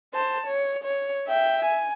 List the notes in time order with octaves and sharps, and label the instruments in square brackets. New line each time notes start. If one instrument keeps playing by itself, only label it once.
[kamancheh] C5 A5
C#5
C#5
E5 G5
G#5